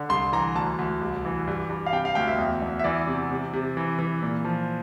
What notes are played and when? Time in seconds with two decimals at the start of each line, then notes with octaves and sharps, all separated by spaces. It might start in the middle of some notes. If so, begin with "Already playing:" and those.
Already playing: D3
0.09 C2 C6
0.33 E3 A#5
0.55 D2 A5
0.79 D2
1.01 C2
1.25 E3
1.47 G2
1.70 G2
1.86 F5
1.93 C3 G5
2.05 F5
2.15 D2 G5
2.27 E5
2.38 E2
2.62 E2
2.79 E5
2.84 E3 D5
3.07 C3
3.31 C3
3.53 C3
3.77 E3
3.99 E3
4.22 A#2
4.44 F3